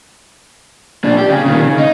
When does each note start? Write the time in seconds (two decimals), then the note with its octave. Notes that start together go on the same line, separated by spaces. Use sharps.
1.04 A#2 D4
1.18 G4
1.30 C#3
1.46 A#2 D#3
1.63 C#3
1.78 D#4